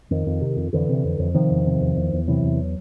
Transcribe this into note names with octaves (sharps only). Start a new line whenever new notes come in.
F2 D#3
F2
C3
F2
F2 D3 E3
C3
F2
F2
C3 D#3 F3
E2
C3
E2
E2
E2
C3 E3 F#3
E2